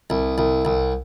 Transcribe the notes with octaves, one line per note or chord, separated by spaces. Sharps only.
C2
C2
C2